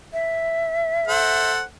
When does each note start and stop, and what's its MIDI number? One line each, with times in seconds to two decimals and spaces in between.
0.13 1.51 76
1.08 1.62 69
1.08 1.62 72
1.08 1.62 78